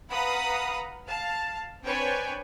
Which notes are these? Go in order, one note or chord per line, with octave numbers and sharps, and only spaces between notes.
B4 F5 F#5 A#5 B5 D#6
F5 A5
C4 D4 B4 C#5 G5 G#5